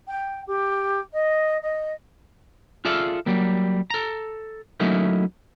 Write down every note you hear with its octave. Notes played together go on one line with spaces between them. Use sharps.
G5
G4
D#5
D#5
F4 G#4 A4 D5 E5 F5
F#3 G3 A#3
A4 A#5
F#3 A3 A#3 C#4 D#4 E4